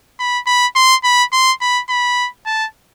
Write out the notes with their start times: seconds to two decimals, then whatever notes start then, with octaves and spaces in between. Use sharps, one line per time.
0.19 B5
0.47 B5
0.76 C6
1.04 B5
1.33 C6
1.61 B5
1.89 B5
2.46 A5